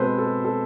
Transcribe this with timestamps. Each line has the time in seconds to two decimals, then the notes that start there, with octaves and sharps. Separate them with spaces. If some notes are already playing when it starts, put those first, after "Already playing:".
Already playing: B2 G#3 C4 A4 B4 C5
0.18 A4
0.45 A4